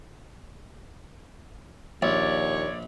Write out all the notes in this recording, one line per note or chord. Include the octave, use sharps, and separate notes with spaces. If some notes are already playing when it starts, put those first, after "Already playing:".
A#1 D#2 C#5 D5